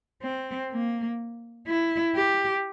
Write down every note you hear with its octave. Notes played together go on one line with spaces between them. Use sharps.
C4
A#3
E4
G4